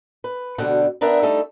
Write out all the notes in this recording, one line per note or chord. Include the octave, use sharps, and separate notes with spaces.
B4
D2 B2 D3 G3 F#5 G5
B3 D4 A#4 E5 F#5 G5
G3 A3 D#4 A4